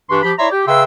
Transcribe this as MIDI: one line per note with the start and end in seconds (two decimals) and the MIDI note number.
0.10 0.22 43
0.10 0.22 52
0.10 0.22 62
0.10 0.22 67
0.10 0.22 84
0.10 0.22 85
0.23 0.33 53
0.23 0.33 67
0.23 0.33 83
0.39 0.50 64
0.39 0.50 73
0.39 0.50 74
0.39 0.50 76
0.39 0.50 82
0.39 0.50 84
0.52 0.66 67
0.68 0.84 49
0.68 0.84 71
0.68 0.84 76
0.68 0.84 79
0.68 0.84 84
0.68 0.84 88